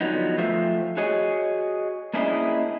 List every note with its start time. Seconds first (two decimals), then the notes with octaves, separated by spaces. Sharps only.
0.01 D3 F3 F#3 B3 D#4
0.38 F3 A3 F4 C5 E5
0.97 F#4 G#4 C#5 D#5
2.14 A#3 C#4 D4 E4 G#4 D#5